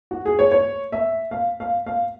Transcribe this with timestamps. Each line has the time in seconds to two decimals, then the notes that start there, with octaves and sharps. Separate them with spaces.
0.11 F#4
0.26 G#4
0.39 C#5
0.52 C#5
0.92 E5
1.31 F5
1.60 F5
1.86 F5